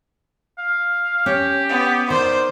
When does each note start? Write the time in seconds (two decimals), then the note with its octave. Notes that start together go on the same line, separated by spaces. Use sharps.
0.58 F5
1.26 C#4 G4
1.69 B3
2.10 D#3 C5 D5